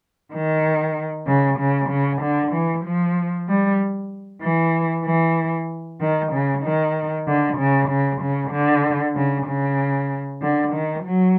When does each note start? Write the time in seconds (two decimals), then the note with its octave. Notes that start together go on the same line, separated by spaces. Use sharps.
0.32 D#3
1.27 C#3
1.58 C#3
1.89 C#3
2.21 D3
2.52 E3
2.85 F3
3.47 G3
4.42 E3
5.05 E3
6.00 D#3
6.32 C#3
6.63 D#3
7.26 D3
7.58 C#3
7.89 C#3
8.21 C#3
8.51 D3
9.15 C#3
9.46 C#3
10.41 D3
10.73 D#3
11.04 F#3